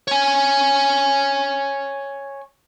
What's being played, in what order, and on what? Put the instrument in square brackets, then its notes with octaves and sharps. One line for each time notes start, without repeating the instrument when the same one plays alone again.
[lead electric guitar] C#5 G#5